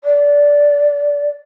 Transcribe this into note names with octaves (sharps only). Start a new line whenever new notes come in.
D5